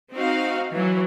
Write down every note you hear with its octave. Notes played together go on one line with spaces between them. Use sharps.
C4 D#4 F#4 F5
E3 F#3